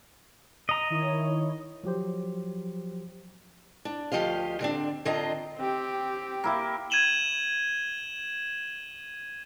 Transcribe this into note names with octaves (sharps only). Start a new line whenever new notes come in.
D#5 A#5
D#3 E4 C#5
F3 F#3 G4 C5
D4
D2 C3 F3 G4 D#5 F5
D3 C4 D4
D3 C4 D4 F4 D#5 A#5
C4 G4
A#3 E4 G4
G#6 D#7 E7 F#7 G7